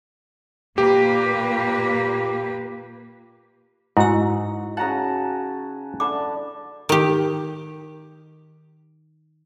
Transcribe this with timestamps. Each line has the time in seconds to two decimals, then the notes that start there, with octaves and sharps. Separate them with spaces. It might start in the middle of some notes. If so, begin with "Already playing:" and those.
0.78 A#2 A#3 G4 B4
3.97 G#2 D#4 E4 F#4 F#5 E6
4.77 C#3 F#4 F#5 A5 A#5
6.00 D3 E4 A5 D6
6.89 D#3 G4